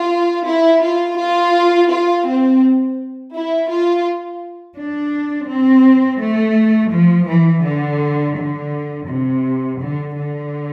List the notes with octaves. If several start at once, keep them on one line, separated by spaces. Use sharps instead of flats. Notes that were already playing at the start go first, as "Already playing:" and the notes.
Already playing: F4
E4
F4
F4
F4
C4
E4
F4
D4
C4
A3
F3
E3
D3
D3
C3
D3
D3